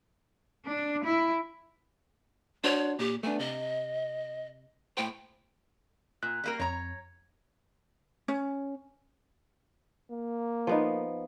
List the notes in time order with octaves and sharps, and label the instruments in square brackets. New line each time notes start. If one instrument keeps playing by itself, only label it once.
[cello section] D4
E4
[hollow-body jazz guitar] D4 F#4 C5 [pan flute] C#5
[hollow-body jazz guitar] A#2 [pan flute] G4
[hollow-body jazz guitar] A3 B3 D4 [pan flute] G#5
[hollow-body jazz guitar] C3 [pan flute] D#5
[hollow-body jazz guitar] A2 C5 [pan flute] G5
[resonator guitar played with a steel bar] A#2 [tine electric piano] F#6
[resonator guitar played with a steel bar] G3 A#3 A#4
[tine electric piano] F2 [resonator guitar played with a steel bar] C#5 A#5
[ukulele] C#4
[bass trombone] A#3
[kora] F3 B3 D#4